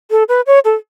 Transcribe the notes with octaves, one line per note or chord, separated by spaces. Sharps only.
A4
B4
C#5
A4